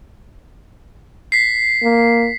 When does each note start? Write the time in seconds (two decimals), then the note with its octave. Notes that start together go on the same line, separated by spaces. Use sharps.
1.32 B6 C7
1.83 A#3